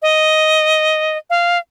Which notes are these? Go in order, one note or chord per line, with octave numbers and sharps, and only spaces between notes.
D#5
F5